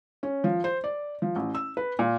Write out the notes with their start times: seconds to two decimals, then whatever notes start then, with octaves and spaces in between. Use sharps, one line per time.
0.23 C#4
0.44 F3
0.64 C5
0.84 D5
1.22 F3
1.36 A1
1.55 E6
1.77 B4
1.99 A#2